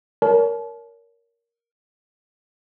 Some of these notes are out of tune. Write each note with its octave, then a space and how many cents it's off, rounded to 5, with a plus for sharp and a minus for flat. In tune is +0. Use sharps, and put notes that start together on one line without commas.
A#4 +0 C#5 +35 A5 -40